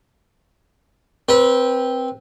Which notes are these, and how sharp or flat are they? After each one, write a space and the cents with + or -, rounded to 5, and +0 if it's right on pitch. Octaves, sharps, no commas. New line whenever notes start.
C4 +0 B4 -25